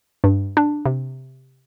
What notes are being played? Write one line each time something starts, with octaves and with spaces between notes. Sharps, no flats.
G2
D4
C3